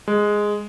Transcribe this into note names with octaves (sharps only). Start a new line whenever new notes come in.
G#3